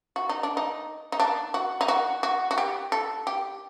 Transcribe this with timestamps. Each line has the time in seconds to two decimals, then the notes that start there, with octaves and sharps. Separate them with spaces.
0.16 F#4
0.29 D#4
0.43 D4
0.57 D#4
1.12 D#4
1.20 D4
1.54 F#4
1.81 D#4
1.88 F#4
2.23 F#4
2.51 F#4
2.58 G4
2.92 A4
3.27 G4